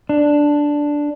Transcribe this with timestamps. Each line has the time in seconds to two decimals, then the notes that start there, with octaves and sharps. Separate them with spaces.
0.09 D4